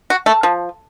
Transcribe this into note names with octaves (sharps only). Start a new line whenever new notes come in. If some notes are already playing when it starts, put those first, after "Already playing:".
F#4
A3
F3